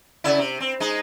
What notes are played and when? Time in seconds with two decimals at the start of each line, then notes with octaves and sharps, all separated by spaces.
0.24 C#3 E4
0.39 C3
0.60 C4
0.80 G#3 D#4